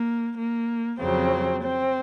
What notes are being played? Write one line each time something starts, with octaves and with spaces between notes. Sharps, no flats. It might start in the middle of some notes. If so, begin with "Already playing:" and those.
Already playing: A#3
A#3
F2 C#3 F#3 C4
C4